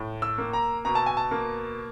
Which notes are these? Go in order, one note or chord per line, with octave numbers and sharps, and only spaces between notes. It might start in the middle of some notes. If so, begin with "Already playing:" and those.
Already playing: A2
E6
A#3
A#5
B2 A#5
A5
G#5
A5
A#3